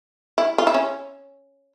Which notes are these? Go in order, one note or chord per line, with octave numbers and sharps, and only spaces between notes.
E4
F4
E4
C#4